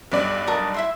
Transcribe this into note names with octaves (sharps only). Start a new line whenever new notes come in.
B1 G2 D5
A#4 A5 D#6
E4 E5 C6